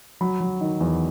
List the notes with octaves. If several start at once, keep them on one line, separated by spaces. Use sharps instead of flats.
F#3 B5
F#3
D#3
E2